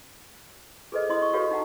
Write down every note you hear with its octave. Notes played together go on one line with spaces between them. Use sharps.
G#4 A4 B4 C5 D#5
E4 D#5 C6 D#6
C#6
F#4 G4 A4 B4 C#5 F5
D#4 F#5 A#5